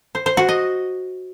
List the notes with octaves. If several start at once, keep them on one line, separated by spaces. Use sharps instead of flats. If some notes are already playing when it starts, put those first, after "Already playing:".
C5
C5
F#4
D#5